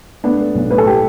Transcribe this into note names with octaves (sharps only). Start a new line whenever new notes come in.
A3 B3 D4
A3
B1
A2 B4
A4
A3 G4